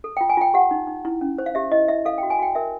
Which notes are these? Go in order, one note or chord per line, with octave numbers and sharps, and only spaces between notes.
A4
F4 G5
G#5
F4 G5
G4 F#5
D#4
D#4
E4
C#4
C5
F5
G4 E5
E4 D#5
E4 E5
A4 F5
F#4 G5
G#5
F#4 G5
A#4 E5